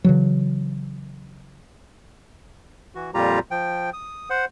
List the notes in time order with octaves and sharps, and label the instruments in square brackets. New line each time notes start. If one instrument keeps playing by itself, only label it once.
[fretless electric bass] C#3 E3 F#3
[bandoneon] E3 F#4
F2 A#2 G3 F4 G4 A#5
F3 G5
D#6
C5 F#5